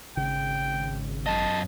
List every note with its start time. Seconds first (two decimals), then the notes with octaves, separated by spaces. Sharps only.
0.17 G#1 C#3 G5
1.26 F#2 D#5 A5